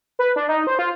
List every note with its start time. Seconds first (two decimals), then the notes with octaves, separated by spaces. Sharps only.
0.19 B4
0.36 D4
0.49 D#4
0.67 C5
0.79 F4